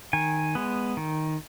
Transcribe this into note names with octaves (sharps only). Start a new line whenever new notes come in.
D#3 G#5
G#3 B3
D#3